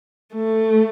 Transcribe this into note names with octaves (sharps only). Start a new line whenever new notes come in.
A3